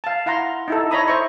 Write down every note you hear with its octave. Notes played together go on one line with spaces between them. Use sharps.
F5 A5
E4 F5 F#5 A#5 C6
D#4 E4 A4
C#5 D#5 A#5 B5 D#6
C5 D#5 E5 C#6